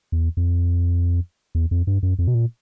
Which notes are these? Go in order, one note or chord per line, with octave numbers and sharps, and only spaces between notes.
E2
F2
E2
F2
G2
F#2
F2
B2
A#2